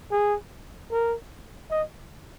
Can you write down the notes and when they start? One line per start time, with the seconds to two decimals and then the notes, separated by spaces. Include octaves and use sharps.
0.12 G#4
0.92 A#4
1.71 D#5